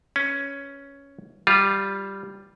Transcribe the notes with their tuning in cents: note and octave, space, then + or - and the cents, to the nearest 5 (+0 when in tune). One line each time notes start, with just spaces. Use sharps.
C#4 +5 B4 +0
G3 +0 F4 +0